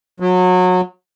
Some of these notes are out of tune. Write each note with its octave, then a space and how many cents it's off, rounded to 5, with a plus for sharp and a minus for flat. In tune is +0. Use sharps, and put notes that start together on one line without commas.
F#3 -25